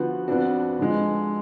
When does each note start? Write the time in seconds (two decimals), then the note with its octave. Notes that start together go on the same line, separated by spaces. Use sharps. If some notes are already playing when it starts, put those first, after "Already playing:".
Already playing: D3 F3 B3 F#4
0.28 F2 F3 B3 D4 F#4
0.79 D3 F3 G#3